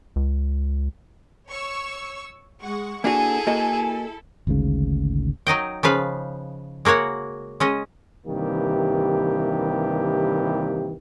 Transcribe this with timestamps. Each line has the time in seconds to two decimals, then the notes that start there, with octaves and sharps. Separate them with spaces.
0.16 C#2
1.48 C#5 C#6 E6
2.62 G#3 F#5 C#6
3.04 A#3 D4 E4 F#4 G#4 A4 G#5
3.47 A#3 F#4 D#5
4.47 G#1 D2 G#2 C#3
5.47 F#3 D#4 D#5 G5
5.83 C#3 F3 B4 F5
6.85 G#3 A#3 F#4 C#5 F#5
7.60 G#3 C#4 D#5
8.26 G2 C3 D#3 E3 A#3 G4